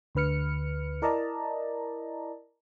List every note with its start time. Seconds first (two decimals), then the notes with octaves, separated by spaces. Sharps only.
0.15 D2 D3 B4 F6 C#7
1.02 E4 A#4 D5 D#5 A5 A#5